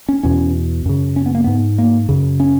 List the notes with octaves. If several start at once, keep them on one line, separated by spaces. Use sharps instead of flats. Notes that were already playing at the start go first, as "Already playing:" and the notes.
C#4
E2 B2 C#4
F#2 C#3
C#4
B3
A#3
G#2 B3
A#3
F#2 C#3
C#4